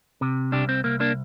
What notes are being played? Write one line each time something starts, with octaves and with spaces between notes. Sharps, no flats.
C3
C2 D4 G4
C4
C2 A#3
A#3 D4